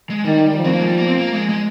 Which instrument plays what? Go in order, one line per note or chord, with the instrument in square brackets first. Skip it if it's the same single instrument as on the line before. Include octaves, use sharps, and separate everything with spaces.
[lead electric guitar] G#3
[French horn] D#3 [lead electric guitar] G3
[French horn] F3
[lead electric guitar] C4
A#3
G#3
G3
A#3
C4
A#3
G#3
G#3